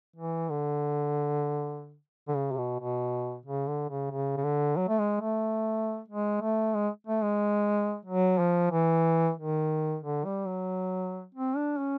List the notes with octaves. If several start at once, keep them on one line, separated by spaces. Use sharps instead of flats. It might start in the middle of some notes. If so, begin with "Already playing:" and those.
E3
D3
D3
C#3
C3
B2
B2
C#3
D3
C#3
C#3
C#3
D3
F#3
A3
G#3
A3
G#3
A3
G#3
A3
G#3
F#3
F3
E3
D#3
D3
G3
F#3
C4
D4
C#4